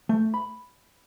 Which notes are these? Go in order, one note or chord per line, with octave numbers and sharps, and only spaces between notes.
A3
B5